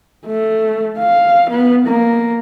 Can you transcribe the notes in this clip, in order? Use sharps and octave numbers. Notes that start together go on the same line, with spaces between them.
A3
F5
B3
A#3